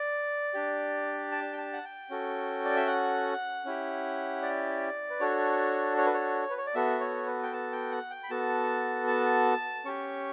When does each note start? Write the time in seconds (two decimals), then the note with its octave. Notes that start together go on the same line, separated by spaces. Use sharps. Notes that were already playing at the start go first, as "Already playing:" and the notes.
Already playing: D5
0.54 D4 G4
1.32 A5
1.53 G5
1.58 A5
1.73 F#5
1.85 G5
2.10 C#4 F#4 A4
2.65 D5
2.76 E5
2.87 F#5
3.65 C#4 E4 G4
4.42 D5
5.10 B4
5.20 D4 F#4 A4 C#5
5.98 C#5
6.06 B4
6.14 C#5
6.50 B4
6.58 C#5
6.66 D5
6.75 B3 F#4 A4 E5
7.00 C#5
7.26 B4
7.43 G5
7.53 A5
7.72 G5
7.91 F#5
8.11 G5
8.24 B5
8.30 B3 F#4 A4 A5
9.07 A5
9.85 C#4 G4 C#6